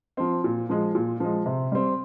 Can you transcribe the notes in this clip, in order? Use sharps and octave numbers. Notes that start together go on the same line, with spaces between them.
F3 C4
A#2
F3 G#3
A#2
F3 G#3
C3
G3 C4